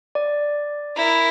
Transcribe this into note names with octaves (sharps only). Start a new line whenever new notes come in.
D5
E4 A#4